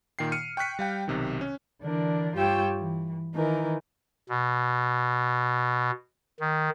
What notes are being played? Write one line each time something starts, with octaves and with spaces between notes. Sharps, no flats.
A#2 D#3 G5 C7
F6 C#7 D#7
G5 C#6 F#6 B6 C#7
G3 F5 G5
B1 C3 D#3
C#4
D3 E3 D4 A#4
G2 F4 G4 C#5 G5 E6
E3
D#3 E3 D#4 A#4
B2
D#3